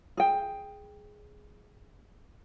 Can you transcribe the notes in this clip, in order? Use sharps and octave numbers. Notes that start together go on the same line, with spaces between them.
G#4 G5